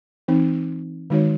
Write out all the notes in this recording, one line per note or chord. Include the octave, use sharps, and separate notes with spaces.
E3 C4 D#4
D#3 G#3 D#4 F#4 C#5